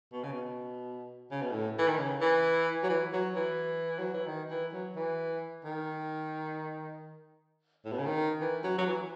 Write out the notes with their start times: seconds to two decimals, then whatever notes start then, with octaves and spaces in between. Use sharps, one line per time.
0.13 B2
0.23 C#3
0.32 B2
1.31 C#3
1.42 B2
1.52 A2
1.79 E3
1.88 D#3
1.98 C#3
2.21 E3
2.83 F#3
2.89 E3
3.13 F#3
3.36 E3
3.99 F#3
4.14 E3
4.27 D#3
4.50 E3
4.73 F#3
4.96 E3
5.65 D#3
7.85 A2
7.92 B2
7.99 C#3
8.06 D#3
8.41 E3
8.64 F#3
8.78 F#3
8.87 E3